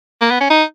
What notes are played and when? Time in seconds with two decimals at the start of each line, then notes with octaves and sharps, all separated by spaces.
0.21 A#3
0.31 B3
0.40 C#4
0.50 D#4